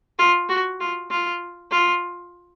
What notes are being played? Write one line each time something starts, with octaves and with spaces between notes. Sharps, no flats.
F4
F#4
F4
F4
F4